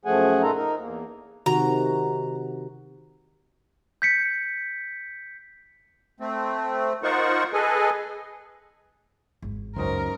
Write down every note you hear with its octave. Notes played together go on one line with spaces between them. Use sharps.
F#2 F3 A3 G#4 F#5 G#5
A#2 D#4 F4 A4 A#4 A#5
D#4 A#4
E2 A#3
C3 D#3 F#4 A#5
G6 B6 C#7
A3 C4
D#4 F4 A#4 C5 F#5 C#6
G#4 A4 B4 D#5 G#5
G#1 E2
C#2 F#2 C#4 D#4 A#4 C5